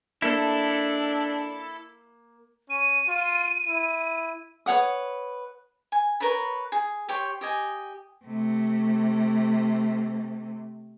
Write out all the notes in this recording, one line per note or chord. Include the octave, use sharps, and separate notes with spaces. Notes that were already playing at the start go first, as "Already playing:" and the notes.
A#3 D4 E4 A4
C#4 D#7
F4
E4
B4 C#5 F#5 D#6
G#5
A#4 B4 C#5 B5
G#4
G4 C#5 G5 C6
G4 D#5 G#5
C3 A3